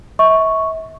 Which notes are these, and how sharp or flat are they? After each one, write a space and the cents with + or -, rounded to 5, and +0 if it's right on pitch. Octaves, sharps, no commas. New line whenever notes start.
E5 -35 C#6 +0